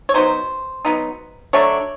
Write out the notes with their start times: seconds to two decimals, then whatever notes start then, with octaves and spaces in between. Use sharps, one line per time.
0.09 C#5
0.14 F#3 B3 D#4 C5
0.85 F#3 B3 D#4
1.53 D3 F#3 A3 D4 C#5